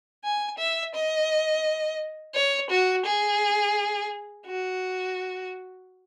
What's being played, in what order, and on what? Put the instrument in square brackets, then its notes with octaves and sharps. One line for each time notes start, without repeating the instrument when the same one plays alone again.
[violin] G#5
E5
D#5
C#5
F#4
G#4
F#4